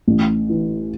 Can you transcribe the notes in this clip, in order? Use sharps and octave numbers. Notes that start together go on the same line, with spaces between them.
A1
E3